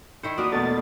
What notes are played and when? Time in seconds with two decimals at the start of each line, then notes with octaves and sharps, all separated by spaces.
0.23 D#3 E4 C5 C#7
0.38 A#3 F#4 A#4 B4 D5 D#6
0.52 E2 B2 A3 A6